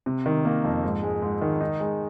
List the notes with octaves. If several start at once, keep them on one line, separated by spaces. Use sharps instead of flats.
C3
D#3
A#3
F2
G#2
G#3
G#2
D#3
D#4
G#3